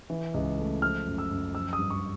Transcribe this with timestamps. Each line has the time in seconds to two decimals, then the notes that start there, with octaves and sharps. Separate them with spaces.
0.10 E3
0.34 C#2
0.58 A3
0.82 F3 F6
1.06 F#2
1.18 E6
1.31 F#2
1.55 F3 E6
1.73 D#6
1.79 G2
1.90 C#6